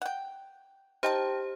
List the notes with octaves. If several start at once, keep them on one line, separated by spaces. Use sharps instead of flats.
F#5 G5
D#4 G4 C5 G5 A5